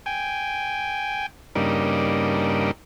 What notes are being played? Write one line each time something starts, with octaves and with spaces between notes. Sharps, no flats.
G5 G#5
G2 C#3 G3 A#3 D4 D#4